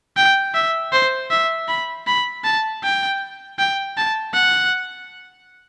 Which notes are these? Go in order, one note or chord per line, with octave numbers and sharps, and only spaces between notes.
G5
E5
C5
E5
B5
B5
A5
G5
G5
A5
F#5